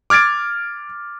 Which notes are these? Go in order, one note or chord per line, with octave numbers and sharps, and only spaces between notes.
D6 F6 G#6 A6 D7